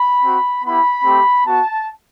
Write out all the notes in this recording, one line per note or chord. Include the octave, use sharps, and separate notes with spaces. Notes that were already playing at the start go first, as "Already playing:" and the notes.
Already playing: B5
C4 F#4
B3 E4 G4 B5
A3 C4 G4
B3 F#4 A5